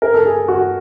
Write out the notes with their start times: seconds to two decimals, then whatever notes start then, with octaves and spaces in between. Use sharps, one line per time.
0.02 A#4
0.14 A4
0.26 G#4
0.48 F#4